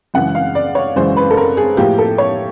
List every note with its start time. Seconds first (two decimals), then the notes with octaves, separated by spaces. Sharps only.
0.14 F#2 C#3 E3 G#3 F#5
0.35 F5
0.55 D5
0.75 C#5
0.96 F#2 C#3 E3 G#3 C5
1.17 B4
1.30 A4
1.37 A#4
1.57 G#4
1.77 A2 F3 A#3 G4
1.99 A4
2.18 C#5